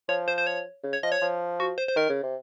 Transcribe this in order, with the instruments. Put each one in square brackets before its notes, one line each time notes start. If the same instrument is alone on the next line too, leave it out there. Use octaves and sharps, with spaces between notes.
[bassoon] F3 [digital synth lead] C#5
[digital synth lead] C5
C5
C#5
[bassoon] C#3
[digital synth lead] C#5
[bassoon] F3 [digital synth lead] D#5
[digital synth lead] C#5
[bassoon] F3
[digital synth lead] F#4
C5
C5
[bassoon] D#3 [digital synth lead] A#4
[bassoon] C#3
C3